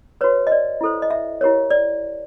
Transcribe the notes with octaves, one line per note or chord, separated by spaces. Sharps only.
F#4 B4 C#5
D#5
D5
E4 A4 C5
D#5
E5
E4 G4 A#4 C#5
D5